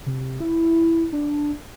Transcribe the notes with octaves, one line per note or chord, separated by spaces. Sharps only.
C3
E4
D4